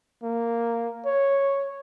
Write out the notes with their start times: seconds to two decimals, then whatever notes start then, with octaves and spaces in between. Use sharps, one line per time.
0.23 A#3
1.06 C#5